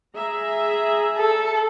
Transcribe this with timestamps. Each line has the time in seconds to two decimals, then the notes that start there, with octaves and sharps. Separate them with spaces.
0.15 G#4 E5 A#5
1.18 A4